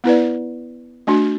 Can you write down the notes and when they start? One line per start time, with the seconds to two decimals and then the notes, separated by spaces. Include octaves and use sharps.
0.04 B3 E4 B4 D5
1.07 A3 D4 F#4